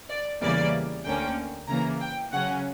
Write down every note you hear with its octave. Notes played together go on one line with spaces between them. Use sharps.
D5
E2 C#3 E3 G3 A#3 D5
D2 D3 A#3 C#4 G5
C#3 E3 A#3 A#5
G5
C#3 F#3 C#4 F#5